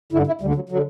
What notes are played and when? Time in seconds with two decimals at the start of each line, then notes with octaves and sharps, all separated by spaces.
0.12 G2 D3 E4
0.27 E4
0.41 D2 D3 G3
0.55 F#3
0.69 D3 F#3